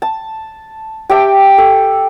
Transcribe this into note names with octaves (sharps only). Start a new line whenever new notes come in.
A5
G4 E5 G5 A5
A4